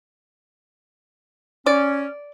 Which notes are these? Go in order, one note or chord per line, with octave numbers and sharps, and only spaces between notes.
C#4 D5